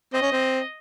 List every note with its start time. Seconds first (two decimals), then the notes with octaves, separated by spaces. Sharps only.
0.13 C4 D#5
0.22 C#4
0.32 C4